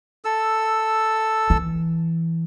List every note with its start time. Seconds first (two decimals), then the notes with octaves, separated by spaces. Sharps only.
0.25 A4 E6
1.50 E3